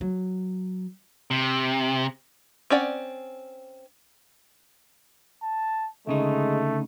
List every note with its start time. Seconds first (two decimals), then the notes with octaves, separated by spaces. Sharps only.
0.01 F#3
1.31 C3
2.70 C4 C#4 D5 F#5
5.43 A5
6.07 D2 C#3 G#3 A3 D#4